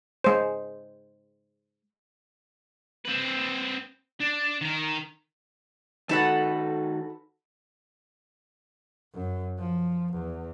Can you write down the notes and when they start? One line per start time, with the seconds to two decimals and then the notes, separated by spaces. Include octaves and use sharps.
0.24 G#3 C5
3.05 C4 B4
4.20 D4
4.61 D#3 A#4
6.09 D#3 D#4 F#4 A4 B4 F#5
9.14 F#2
9.59 F3
10.13 E2